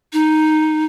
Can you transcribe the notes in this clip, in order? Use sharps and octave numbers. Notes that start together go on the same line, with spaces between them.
D#4